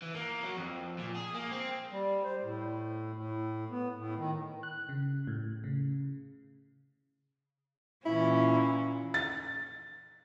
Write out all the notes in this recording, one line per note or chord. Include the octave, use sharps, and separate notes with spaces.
E3
A#3
F#3
F2
A#2
G#4
A#3
C4
G3
C5
A2
A2
B3
A2
D#3
F#6
C#3
A2
C#3
A#2 E3 C#4 E4
A6